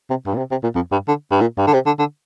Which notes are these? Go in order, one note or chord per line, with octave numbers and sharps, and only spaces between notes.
C3
G2
A#2
C3
C3
A#2
F2
G2
D3
G2
A#2
G2
D3
C3
D3
D3